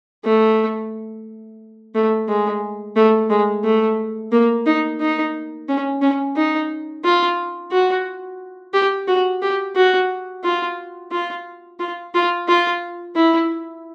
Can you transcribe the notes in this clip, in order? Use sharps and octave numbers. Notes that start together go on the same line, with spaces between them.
A3
A3
G#3
A3
G#3
A3
A#3
D#4
D#4
C#4
C#4
D#4
F4
F#4
G4
F#4
G4
F#4
F4
F4
F4
F4
F4
E4